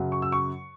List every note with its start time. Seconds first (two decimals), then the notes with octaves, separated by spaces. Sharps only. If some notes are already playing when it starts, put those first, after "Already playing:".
Already playing: F#2 C#3 F#3
0.12 C#6
0.22 E6
0.32 C#6